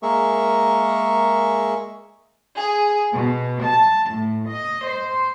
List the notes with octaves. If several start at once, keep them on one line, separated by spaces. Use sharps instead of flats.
G#3 A#3 G#4 A#4 E5 C#6
G#4
B2
A5
A2
D#5
C5